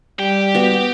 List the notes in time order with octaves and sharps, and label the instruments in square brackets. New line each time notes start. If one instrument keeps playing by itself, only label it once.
[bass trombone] G3 [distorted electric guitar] G4
[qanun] B3 F#4